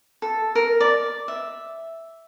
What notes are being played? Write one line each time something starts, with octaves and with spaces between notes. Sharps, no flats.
A4
A#4
D5
E5